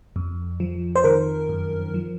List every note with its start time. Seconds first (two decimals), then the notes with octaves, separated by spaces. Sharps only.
0.16 F2
0.60 F3
0.96 C5
1.04 D#3 A#4
1.49 F#2
1.94 F3